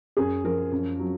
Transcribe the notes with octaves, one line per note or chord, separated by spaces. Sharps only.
F#2 G#4
F3 A#4
F#2
F#3